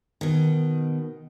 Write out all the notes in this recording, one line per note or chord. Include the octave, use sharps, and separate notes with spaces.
B2 D#3